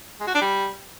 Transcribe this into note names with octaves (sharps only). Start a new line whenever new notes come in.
G#3
F#4
D4
G3